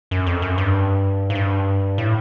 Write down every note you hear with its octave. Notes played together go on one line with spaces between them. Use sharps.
F#2
F2
F#2
G2
G#2
G2
A2